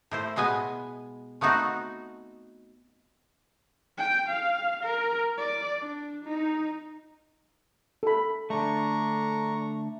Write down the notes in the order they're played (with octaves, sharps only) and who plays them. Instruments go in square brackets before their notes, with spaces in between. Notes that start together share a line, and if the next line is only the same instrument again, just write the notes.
[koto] A2 E4 C5
B2 G#3 B3 G#5
A3 B3 C4 D#4 F#4
[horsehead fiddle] G5
F5
A#4
D5
D4
D#4
[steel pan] A4 B5
[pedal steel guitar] D3 A3 [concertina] D4 A#5 C#6